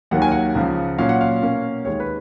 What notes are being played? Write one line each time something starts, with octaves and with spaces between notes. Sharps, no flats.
D#2 D#3 F#3 A#3 F#5
G#5
F#5
C#2 C#3 F3
A#2 F#3 C#4 F5
F#5
F5
B2 A#3 C#4
D#2 D#3 G#3 C#5
B4